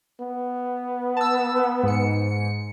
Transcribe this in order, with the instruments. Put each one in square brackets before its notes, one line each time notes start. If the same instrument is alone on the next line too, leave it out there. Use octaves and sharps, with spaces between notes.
[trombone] B3
[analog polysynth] A5 E6
G#2 C#7